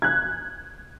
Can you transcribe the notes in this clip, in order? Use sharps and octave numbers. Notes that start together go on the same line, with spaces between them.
F#6 G#6